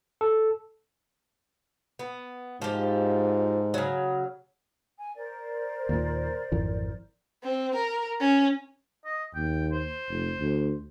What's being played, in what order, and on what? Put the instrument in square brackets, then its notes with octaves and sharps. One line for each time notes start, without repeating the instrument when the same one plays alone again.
[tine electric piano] A4
[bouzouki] B3
[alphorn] G#2 [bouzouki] F3 G4
[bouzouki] C#3 F#3
[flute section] G#5
A#4 C5 D5
[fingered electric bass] D#2 A#2
G#1 F2 E3
[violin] C4
A#4
C#4
[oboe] D#5
[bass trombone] D#2 [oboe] G5
[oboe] C5
[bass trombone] F1
D2